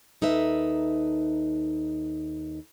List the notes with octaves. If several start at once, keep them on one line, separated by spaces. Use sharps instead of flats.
D#2 D#4 A4 B4 E5